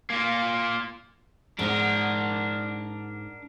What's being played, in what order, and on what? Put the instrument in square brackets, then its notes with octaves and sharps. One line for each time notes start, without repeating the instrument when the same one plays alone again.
[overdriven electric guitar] A#3 F4
[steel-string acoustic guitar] G#2 F#5 [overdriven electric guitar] D4 A#4